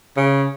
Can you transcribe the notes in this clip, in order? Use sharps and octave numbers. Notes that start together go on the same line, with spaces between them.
C#3